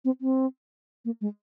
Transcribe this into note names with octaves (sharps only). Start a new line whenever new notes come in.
C4
C4
A#3
G#3